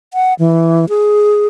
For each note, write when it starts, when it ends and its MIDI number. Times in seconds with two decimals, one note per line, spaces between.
0.14 0.34 78
0.39 0.89 52
0.89 1.47 68